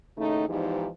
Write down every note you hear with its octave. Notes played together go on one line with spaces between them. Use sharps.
D#2 A2 C#3 A3 D#4
E2 G#2 E3 F3 D#4 G4